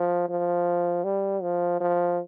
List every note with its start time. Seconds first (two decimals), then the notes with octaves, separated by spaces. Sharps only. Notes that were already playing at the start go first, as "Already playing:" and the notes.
Already playing: F3
0.29 F3
1.04 G3
1.42 F3
1.80 F3